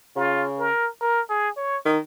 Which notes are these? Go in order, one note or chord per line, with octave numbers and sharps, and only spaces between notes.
C#3 F4
A#4
A#4
G#4
C#5
D#3